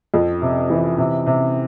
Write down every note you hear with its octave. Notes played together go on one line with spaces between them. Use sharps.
F2
C3
E3
C3
C3